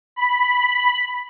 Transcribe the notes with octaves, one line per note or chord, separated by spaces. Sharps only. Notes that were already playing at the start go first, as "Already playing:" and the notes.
B5